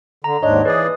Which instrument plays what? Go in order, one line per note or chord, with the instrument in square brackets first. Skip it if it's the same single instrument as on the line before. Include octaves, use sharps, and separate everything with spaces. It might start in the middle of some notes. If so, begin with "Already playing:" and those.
[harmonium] D3 [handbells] A#5
[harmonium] D#2 G#2 D4 [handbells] C#5 D#5
[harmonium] E3 G#4 D5 [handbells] B4 D#6